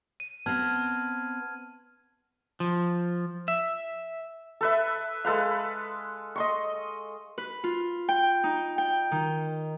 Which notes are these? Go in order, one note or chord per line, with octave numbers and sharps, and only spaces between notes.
D#7
B3 C4 A5 F6 G#6
F3
E5
A4 B4 E5
G#3 A4 B4 F5
D#5 C6 C#6
B4
F4
G5
D#4
G5
D#3